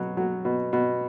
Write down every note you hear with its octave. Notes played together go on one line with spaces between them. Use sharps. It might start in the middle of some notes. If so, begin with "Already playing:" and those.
Already playing: B2 F#3
F#3
B2
B2